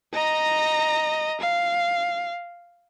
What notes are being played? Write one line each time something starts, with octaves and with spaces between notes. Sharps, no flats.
D#5 A#5
F5